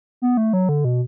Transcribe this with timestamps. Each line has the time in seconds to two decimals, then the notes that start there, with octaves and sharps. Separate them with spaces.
0.22 B3
0.37 A3
0.53 F#3
0.69 D3
0.84 B2